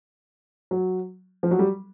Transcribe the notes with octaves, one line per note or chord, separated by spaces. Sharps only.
F#3
F3
F#3
G3